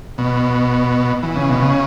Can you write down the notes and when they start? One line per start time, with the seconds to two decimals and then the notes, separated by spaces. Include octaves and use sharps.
0.18 B2
1.23 E3
1.36 C#3
1.49 B2
1.62 C#3